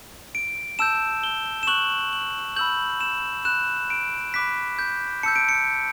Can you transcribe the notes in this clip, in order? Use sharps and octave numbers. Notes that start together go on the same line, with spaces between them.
D7
A5 E6 G6 E7
G7
E7
C#6 F#6 F#7
F#7
B5 E6 G6 F#7
E7
B5 F#6 E7
D7
B5 D6 F#6 B6
G6
A5 E6 G6 C#7
D7
C#7